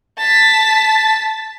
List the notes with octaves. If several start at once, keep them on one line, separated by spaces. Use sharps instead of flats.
A5 B6